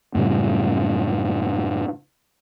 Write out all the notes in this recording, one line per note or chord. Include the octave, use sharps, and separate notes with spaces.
F#2 A2 C#3 G3